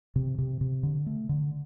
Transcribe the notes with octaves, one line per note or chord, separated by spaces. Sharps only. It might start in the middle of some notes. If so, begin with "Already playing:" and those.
C3
C3
C3
D3
A3
D3